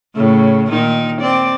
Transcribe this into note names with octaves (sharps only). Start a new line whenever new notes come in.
A2 C#3
A#2 D#3 D#4
C4 D5